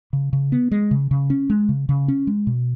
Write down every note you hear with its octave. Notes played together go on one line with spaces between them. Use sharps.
C#3
C#3
B3
G#3
C#3
C#3
C#4
G#3
C#3
C#3
C#4
G#3
B2